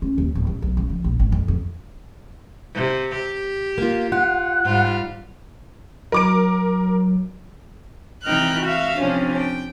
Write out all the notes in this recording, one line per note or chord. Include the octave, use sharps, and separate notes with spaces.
C#4
D#2
D1
C#3
B1
C#3
F3
A#1
G#1
F2
F2
C3
G4
A#3 F4
F4 F#5
G#2 G3 F4
F#3 A#4 D6 D7
C3 E3 D#4 G5 F6 F#6
F#4 E5 F5
C3 F3 C#4 D4
G5